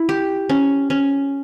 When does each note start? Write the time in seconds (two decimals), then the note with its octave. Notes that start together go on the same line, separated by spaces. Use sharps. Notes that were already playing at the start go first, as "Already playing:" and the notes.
Already playing: E4
0.09 G4
0.50 C#4
0.90 C#4